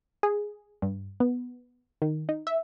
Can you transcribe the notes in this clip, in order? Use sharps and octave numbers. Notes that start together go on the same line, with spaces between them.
G#4
G2
B3
D#3
D#4
E5